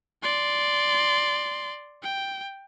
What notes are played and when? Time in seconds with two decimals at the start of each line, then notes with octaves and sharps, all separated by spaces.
0.22 D5 C6
2.02 G5